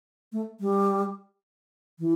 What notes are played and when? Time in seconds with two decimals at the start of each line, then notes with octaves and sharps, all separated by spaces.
0.32 A3
0.60 G3
1.99 E3